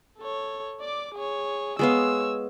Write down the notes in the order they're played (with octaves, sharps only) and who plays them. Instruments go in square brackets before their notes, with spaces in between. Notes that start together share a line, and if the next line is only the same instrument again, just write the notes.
[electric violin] A4 C#5
D5 D6
G#4 C#5
[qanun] G#3 B3 F5 [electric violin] C#5 E6